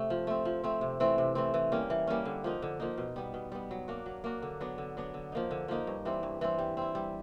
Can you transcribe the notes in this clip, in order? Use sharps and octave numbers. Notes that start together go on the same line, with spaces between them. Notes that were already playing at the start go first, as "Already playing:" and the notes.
Already playing: C3 A3
F3
A3 C4
F3
A3 C4
C3
E3 A3 C4
C3
E3 A3 C4
E3
G3 A#3 C#4
E3
G3 A#3 C#4
D3
F3 A#3 D#4
D3
F3 A#3 D#4
B2
G3 B3
B2
G3 B3
F#3
A#3 D4 F#4
F#3
A#3 D4 F#4
D3
F#3 B3 D4
D3
F#3 B3 D4
D3
F3 A#3 D#4
D3
F3 A#3 D#4
G2
E3 G3 C4
G2
E3 G3 C4
G3
C4 E4
G3